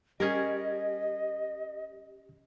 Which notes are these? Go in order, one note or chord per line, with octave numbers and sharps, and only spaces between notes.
G3 C#4 G4 G#4 A#4 D#5 G#6